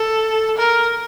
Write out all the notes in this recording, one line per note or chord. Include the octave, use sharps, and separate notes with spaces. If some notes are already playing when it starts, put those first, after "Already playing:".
Already playing: A4
A#4